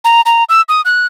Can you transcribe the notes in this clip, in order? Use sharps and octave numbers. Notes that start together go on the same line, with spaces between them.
A#5
A#5
E6
D#6
F#6